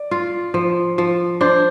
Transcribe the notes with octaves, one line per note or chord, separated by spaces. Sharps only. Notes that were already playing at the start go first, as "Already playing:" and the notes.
Already playing: D5
F4
F3
F3
D4 C5